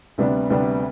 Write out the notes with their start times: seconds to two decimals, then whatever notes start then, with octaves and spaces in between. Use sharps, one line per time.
0.18 D2 C3 G3 B3 D4
0.50 D2 C3 G3 B3 D4